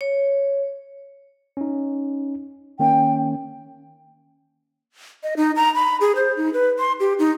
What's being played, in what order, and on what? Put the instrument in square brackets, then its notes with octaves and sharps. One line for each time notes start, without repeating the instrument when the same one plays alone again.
[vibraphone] C#5
[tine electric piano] C#4 D#4
[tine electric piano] D#3 A#3 C#4 [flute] G5
[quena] D#5
D#4
A#5
B5
G#4
C5
D#4
B4
C6
G4
D#4